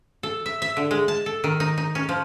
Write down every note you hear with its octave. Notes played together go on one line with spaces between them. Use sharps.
A4
E5
E5
D3
G#3
A5
A4
D#3
D#4
D#4
C#4
F3